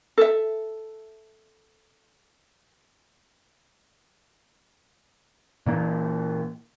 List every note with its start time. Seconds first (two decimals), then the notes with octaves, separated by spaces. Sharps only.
0.18 A4 E5
5.66 A#2 E3 A#3